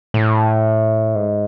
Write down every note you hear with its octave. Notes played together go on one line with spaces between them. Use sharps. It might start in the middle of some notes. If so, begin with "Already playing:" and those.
A2
G#2